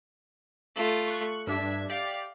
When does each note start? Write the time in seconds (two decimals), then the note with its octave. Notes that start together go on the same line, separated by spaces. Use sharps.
0.76 A3 F4
1.07 C#6 F#6
1.47 G2 D4 E5 G#6
1.90 G4 D5 F5 D7